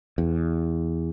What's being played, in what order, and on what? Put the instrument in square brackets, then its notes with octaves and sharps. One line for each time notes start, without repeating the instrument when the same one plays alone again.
[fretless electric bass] E2